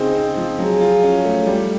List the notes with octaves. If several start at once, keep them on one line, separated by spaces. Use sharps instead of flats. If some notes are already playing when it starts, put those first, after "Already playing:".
Already playing: C#3 C4 D#4 G#4
C4
F3
F#3 G#4
F4
C#4
A3
G3 G4